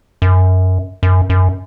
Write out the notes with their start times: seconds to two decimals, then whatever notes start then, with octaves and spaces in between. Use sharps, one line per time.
0.22 F#2
1.03 F#2
1.30 F#2